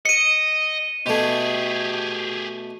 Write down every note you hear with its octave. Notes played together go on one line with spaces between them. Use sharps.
D#5 C#7 D#7
B2 A3 G4 G#4